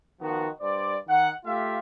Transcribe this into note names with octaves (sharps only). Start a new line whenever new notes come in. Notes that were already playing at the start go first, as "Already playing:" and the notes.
D#3 F3 B3 F#4
G2 C5 D5
D#3 F#5
A3 F4 G4 E5 F5